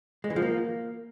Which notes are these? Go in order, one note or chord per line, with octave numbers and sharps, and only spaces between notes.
G#3
E3
F3
A#3